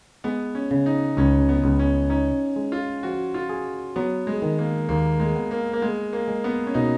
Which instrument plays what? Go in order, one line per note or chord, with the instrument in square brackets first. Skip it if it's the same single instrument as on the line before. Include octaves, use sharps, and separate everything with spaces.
[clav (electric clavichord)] G#3 [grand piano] B3
[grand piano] C#4
[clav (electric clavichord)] C#3
[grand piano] D#4
[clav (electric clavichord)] C#2 [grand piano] C#4
[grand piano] B3
[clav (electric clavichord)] C#2
[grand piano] C#4
[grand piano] C#4 [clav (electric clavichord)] D#4
[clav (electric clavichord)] G#3
[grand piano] F4
[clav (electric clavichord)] F3 [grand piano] F#4
[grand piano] F4
[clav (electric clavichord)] G#4
[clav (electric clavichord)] F#3 [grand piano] B3
[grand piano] G#3
[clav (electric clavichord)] D#3
[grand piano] A#3
[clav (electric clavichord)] D#2 [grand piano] A#3
[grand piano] G#3
[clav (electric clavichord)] B3
[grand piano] A#3
A#3
[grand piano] G#3 [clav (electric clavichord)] B3
[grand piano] A#3
[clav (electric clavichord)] G#3
[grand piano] B3
C#4
[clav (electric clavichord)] B2 [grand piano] D#4